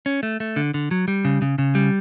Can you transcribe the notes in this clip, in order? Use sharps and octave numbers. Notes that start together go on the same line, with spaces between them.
C#4
A3
A3
D3
D3
F#3
G3
C#3
C#3
C#3
G3